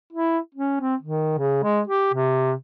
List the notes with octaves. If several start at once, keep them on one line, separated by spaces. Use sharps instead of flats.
E4
C#4
C4
D#3
C#3
G#3
G4
C3